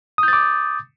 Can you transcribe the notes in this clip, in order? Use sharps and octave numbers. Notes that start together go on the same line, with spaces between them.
D6 D#6 G6 A6